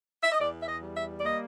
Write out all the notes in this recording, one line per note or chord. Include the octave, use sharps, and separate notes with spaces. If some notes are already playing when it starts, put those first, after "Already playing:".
E5
D#5
E2 D5
E5
D#5
G3
E5
D5
A#3 D#5